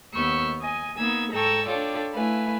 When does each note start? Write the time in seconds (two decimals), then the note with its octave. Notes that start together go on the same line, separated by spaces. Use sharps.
0.14 D#2 B3 C#6 E6 F6 G6
0.60 D#5 G#5
0.98 A#3 B3 D#4 E6 G#6
1.32 G#2 A4 G5 A#5 C#6 E6
1.66 D4 F4 A4 C#5 D5 G5
2.14 A3 E4 B4 F5 G#5